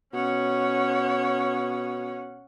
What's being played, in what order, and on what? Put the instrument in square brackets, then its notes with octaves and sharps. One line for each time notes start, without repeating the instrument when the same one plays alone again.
[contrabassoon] B2 [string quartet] C#4 C#5 F#5